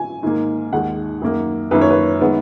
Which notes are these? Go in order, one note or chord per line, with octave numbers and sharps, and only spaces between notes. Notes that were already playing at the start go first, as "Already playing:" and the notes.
Already playing: G#5
G#2 D#3 A#3
D#2 D#3 G#3 F#5
F#2 D#3 A#3
F#2 D#3 A#3 B4
C#5
B4
D#3 G#3 B3